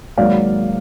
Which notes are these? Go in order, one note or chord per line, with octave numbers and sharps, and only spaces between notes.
G#1 G#2 F#3 A#3 D5 F5